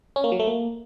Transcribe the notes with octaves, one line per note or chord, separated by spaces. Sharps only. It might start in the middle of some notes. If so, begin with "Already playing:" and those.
C#4
A#3
F#3
A3
A#3